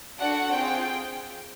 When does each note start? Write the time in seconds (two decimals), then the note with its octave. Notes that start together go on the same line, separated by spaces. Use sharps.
0.19 D4 F#4 A4 F#5
0.55 C4 F4 G#4 G5